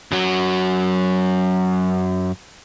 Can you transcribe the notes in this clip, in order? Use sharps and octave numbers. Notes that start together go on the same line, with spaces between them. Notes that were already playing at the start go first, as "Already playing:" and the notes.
F#2 F#3